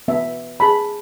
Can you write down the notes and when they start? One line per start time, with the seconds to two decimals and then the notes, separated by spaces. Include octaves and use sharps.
0.08 B3 E5
0.60 G#4 A5 B5